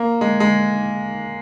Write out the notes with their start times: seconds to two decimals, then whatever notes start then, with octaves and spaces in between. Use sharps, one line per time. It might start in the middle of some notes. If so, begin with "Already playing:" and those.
Already playing: A#3
0.21 G#3
0.40 G#3